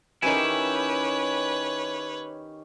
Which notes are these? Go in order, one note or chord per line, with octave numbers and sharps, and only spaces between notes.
D#3 C#4 E4 G4 B4 C#5 G#5